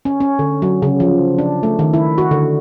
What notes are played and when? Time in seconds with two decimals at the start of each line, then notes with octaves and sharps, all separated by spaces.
0.05 C#4
0.20 C#4
0.39 D3
0.62 F#3
0.82 C#3
1.00 F3
1.38 D4
1.63 A3
1.79 D#3
1.94 E4
2.18 F#4
2.31 D3